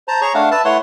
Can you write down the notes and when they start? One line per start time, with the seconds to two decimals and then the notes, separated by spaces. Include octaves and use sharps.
0.08 C5 A5 A#5
0.21 G#4 C#5 A#5 C#6
0.34 A3 D4 F5 F#5
0.51 B4 E5 A5
0.65 A3 E4 B4 C#5 F#5 C6